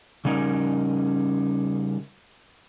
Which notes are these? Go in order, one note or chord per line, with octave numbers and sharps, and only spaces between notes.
C#3 G3 C#4 D#4 A#4